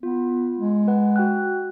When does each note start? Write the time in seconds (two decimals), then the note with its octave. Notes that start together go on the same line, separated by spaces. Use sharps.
0.03 B3 F4
0.58 G#3
0.88 B4 F#5
1.16 F#4 G5 F#6